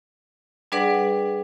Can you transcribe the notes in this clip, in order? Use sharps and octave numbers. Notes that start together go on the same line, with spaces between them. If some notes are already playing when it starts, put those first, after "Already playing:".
G3 D4 G#4 B4 D5 F#5